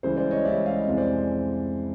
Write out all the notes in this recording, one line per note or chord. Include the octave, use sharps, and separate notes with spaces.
C#2 C#3 E3 G3 C5
C5 D5
C#5 D#5
C#2 C#3 E3 G3 D5 E5
D#5 F5
F2 C3 E3 G#3
C5 D5